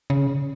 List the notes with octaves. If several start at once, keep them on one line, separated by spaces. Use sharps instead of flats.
C#3